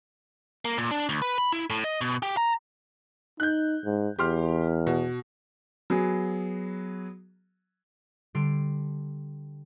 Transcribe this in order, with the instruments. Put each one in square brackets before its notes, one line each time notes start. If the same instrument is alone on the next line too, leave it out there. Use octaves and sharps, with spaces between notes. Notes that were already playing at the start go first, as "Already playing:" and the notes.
[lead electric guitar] A#3
A#2
D4
D2
B4
B5
E4
A2
D#5
B2
G4
A#5
[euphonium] D#4 [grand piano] F#6 G6
[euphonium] G#2
[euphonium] E2 [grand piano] G4 C6 F6
[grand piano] B2
[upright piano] F#3 B3 F#4 G#4
[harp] D3 G3 C6 D7